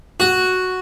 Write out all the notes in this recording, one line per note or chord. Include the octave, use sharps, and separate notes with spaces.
F#4